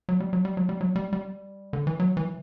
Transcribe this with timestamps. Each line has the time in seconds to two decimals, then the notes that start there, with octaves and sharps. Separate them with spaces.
0.09 F#3
0.20 G3
0.33 F#3
0.45 G3
0.57 F#3
0.69 G3
0.81 F#3
0.96 G3
1.13 G3
1.73 D3
1.87 E3
2.00 F#3
2.17 E3